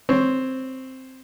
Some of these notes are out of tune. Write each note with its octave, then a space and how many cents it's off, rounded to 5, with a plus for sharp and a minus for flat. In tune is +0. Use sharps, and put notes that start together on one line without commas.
C4 +0 C#5 +0